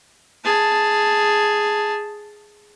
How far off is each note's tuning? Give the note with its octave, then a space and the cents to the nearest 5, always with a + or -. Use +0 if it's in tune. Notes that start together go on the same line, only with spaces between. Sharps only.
G#4 +0 A5 +0